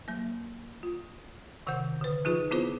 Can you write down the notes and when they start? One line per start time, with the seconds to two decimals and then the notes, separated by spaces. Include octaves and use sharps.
0.08 F#3 A#3
0.83 F4
1.67 C3 D#3 C5 F#5 G6
2.01 D3 B4
2.25 F3 D#4 F4 G#4 B4
2.51 B3 C4 E4 F4 G#4 C5